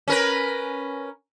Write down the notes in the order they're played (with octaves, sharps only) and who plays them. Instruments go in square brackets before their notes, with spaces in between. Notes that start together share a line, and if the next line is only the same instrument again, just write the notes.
[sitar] C#4 A#4 B4